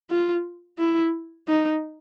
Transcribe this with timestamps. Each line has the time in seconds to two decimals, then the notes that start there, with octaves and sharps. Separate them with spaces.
0.11 F4
0.79 E4
1.48 D#4